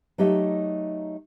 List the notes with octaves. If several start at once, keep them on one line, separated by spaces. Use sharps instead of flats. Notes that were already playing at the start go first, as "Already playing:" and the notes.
F#3 A3 D#4 G4 D#5 E5